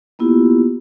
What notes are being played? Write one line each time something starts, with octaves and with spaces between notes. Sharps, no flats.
A#3 B3 E4 F4 G4